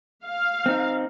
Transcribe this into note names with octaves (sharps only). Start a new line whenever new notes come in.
F5
C4 D#4